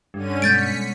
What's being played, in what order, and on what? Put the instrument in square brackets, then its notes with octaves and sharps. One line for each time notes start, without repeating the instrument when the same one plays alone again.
[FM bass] G2 [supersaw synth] D3 C#4 D#7
[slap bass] B2 G3 G#3 [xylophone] G6 A6 D7 [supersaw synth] B6 C#7